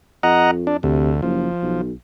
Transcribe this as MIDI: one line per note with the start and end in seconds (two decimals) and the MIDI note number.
0.23 0.77 41
0.23 0.51 75
0.23 0.51 78
0.23 0.51 82
0.67 0.77 62
0.83 1.21 38
0.83 1.11 48
1.22 1.47 30
1.22 1.81 53
1.62 1.92 35